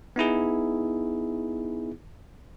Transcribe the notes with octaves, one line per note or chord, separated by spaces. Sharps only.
B3 D#4 E4 G#4